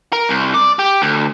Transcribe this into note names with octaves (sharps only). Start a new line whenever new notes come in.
A#4
C2
D5
G4
D2